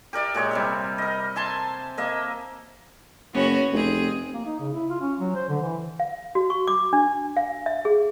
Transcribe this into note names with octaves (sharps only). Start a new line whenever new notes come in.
G4 A#4 D5 E5
A#2 G#3 C#5
C3 G3 E5
A#4 D#5
E5 G#5 A5 C6
A#3 D#5 E5
F#1 B3 C#4 F#4
F1 C4 G#4
A#3
D#4
C#3
E4
F4
C#4
F#3
C5
D3
E3
F5
F#4
C#6
D6
D4
F5
E5
G#4